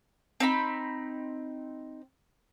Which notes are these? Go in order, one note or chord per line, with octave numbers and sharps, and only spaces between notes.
C4 D#4 B5